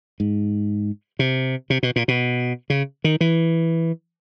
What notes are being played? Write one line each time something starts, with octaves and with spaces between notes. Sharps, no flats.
G#2
C3
C3
B2
A#2
B2
C#3
D#3
E3